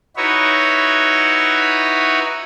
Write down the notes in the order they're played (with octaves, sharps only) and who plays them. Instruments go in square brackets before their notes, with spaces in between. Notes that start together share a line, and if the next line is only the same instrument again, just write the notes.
[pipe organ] D#4 E4 F#4 B4 C#5